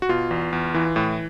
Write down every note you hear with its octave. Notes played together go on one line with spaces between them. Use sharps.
F#4
B2 F4
E2
E2
E3
A2